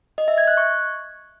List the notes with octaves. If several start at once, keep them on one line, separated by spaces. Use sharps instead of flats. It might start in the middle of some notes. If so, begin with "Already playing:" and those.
D#5
E5
G#6
F#6
C#6